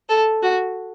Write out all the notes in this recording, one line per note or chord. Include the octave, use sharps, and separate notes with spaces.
A4
F#4